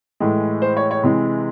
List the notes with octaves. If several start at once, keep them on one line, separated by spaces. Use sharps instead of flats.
A2 E3 G#3
C5
C#5
C#5
C3 E3 G#3